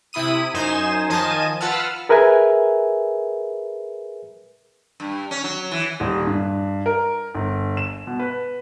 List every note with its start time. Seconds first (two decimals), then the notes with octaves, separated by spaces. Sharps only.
0.13 C3 E4 B5 D#6 D#7
0.54 F#2 D#4 C5 G#5 E7
1.09 D#3 F3 D#5 G#5 A5 D#7
1.60 F4 B4 F#5 A5 E6 F6
2.09 G#4 A#4 B4 E5 G#5
5.00 G2
5.31 C#4
5.44 F#3
5.71 E3
6.00 D#1
6.27 G2
6.86 A#4
7.35 G1
7.77 E7
8.07 B2
8.19 B4